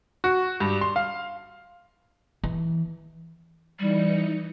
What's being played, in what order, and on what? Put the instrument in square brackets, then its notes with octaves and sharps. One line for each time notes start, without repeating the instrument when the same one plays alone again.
[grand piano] F#4
G2
C6
F5
[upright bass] E3
[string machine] E3 D#4 C#7 [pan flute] G3